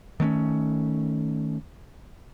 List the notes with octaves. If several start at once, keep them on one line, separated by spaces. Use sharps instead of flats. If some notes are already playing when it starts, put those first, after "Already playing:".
D#3 A3 C4 C#4